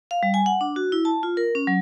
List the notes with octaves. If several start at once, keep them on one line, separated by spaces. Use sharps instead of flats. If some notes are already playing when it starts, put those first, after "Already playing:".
F5
G3
G#5
F#5
D4
F#4
E4
A5
F4
A#4
C#4
F#3